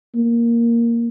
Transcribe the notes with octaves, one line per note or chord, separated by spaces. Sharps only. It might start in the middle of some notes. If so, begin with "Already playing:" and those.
A#3